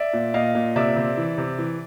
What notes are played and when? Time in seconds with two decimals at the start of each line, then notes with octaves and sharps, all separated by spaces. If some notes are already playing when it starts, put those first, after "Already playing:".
Already playing: D5 E5
0.13 A#2
0.34 A#2 D#5 F5
0.55 A#2
0.76 C3 D5 E5
0.97 C3
1.17 E3
1.38 C3
1.58 E3